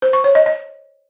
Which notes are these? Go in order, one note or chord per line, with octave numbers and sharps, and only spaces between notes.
C5
C#6
C#5
D#5
D#5